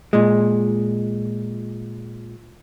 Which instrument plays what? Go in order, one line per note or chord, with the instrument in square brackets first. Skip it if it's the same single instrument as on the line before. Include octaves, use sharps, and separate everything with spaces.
[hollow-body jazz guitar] A#2 G#3